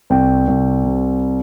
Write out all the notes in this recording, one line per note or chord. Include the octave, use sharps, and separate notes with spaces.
C2 G5
C2
C3